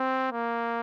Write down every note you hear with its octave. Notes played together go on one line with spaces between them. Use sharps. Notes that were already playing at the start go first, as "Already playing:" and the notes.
Already playing: C4
A#3